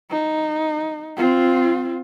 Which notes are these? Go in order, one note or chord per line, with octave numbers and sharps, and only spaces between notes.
D#4
C4 F4